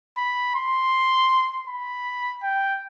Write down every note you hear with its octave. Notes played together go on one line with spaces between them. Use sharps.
B5
C6
B5
G5